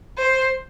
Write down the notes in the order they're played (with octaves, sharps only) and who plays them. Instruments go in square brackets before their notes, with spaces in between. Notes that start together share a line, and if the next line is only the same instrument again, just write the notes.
[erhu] C5